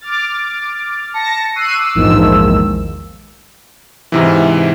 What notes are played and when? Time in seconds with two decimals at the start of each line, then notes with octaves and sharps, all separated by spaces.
0.01 D6 F6 A6
1.14 A5 A#6 C#7
1.55 C#6 E6 F#6 C7 D#7
1.78 D6 E6
1.95 A#1 E2 G#2 D#3 F3 E6
4.12 G#2 C3 E3